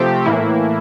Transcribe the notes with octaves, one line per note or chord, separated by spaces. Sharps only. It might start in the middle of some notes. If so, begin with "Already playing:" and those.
Already playing: C3 F3 A3 C4 G4
A2 E3 A#3 E4